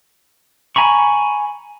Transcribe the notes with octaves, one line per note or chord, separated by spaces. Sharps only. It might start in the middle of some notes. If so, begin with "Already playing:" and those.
G#5 A#5 B5 C#6